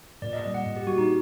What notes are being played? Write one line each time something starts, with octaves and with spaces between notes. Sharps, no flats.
A#2 D5
D#5
G3 A#3 D#5
F#5
A#2
G4
G3 A#3 F#4
D#4